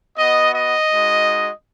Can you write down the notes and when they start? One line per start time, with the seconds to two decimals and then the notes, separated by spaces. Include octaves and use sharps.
0.16 B3 F#4 D#5
0.53 D#5
0.91 G#3 D#4 F#4